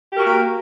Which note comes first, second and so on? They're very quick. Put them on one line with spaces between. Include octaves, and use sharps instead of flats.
G4 A#4 F#4 A#3